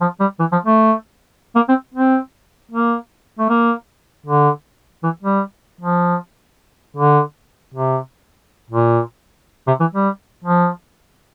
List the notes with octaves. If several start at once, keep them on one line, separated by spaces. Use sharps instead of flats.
F3
G3
E3
F3
A3
A#3
C4
C4
A#3
A3
A#3
D3
E3
G3
F3
D3
C3
A#2
C3
E3
G3
F3